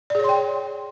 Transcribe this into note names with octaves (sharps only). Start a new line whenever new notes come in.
G#4 C#5 D5 G5 C6